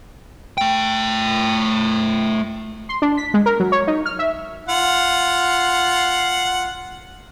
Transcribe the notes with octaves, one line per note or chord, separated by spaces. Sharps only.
A3 G5
C6
D4
B6
G#3
A#4
F#3
C#5
D#4
F6
E5
F4 F#5